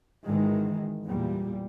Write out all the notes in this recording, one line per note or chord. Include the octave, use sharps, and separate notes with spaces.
G#1 G#2 D#3 E3 G#3
E2 A#2 G3